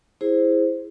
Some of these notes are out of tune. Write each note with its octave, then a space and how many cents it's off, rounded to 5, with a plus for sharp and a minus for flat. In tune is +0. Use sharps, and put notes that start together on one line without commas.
E4 +0 G#4 -10 C5 +0